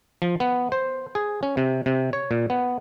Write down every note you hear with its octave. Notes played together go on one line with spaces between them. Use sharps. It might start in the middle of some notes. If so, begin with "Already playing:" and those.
F3
B3
C5
G#4
C#4
C3
C3
C#5
A#2
B3